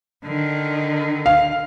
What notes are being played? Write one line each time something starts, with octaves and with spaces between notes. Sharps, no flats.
D3 D#3
F5